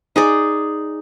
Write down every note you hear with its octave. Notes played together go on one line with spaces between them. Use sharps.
D#4 G#4 D5